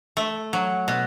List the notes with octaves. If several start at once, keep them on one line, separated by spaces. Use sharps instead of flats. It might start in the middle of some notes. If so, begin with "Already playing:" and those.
A3
F#3
B2